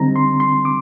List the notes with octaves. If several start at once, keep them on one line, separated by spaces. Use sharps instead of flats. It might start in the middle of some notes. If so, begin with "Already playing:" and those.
Already playing: D3 G3 C4 D#4 A#5
C6
C6
D6